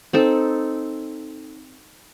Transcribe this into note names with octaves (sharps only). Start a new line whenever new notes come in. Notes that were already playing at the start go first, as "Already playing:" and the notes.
C4 D#4 A4